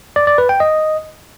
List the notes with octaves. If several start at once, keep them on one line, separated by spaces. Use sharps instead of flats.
D5
D5
B4
G5
D#5